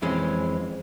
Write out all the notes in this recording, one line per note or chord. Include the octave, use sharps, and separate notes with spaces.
F2 E3 G#3 C4 C#4